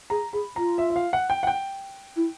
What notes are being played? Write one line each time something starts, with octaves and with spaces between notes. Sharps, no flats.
G#4 A#5
G#4 B5
F4 A#5
E5
E5
F5
F#5
G5
F#5
G5
E4